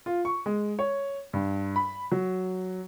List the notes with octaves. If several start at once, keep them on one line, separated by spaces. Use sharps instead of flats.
F4
C#6
G#3
C#5
G2
B5
F#3